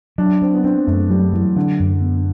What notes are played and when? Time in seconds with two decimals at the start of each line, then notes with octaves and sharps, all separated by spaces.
0.18 F#3 D4
0.42 C4 D4
0.54 B3
0.64 C4 D4
0.87 F#2 A3
1.10 F#3 G3
1.33 E3 F#3
1.56 D3 D4
1.80 F#2
2.02 B3